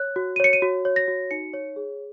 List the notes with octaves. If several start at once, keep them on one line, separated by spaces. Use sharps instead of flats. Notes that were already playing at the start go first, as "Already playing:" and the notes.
Already playing: C#5 F#6
F#4
D#7
C#5 C#7
D#7
F#4
C#5
A#6
F#4
D#4 C#7
C#5
G#4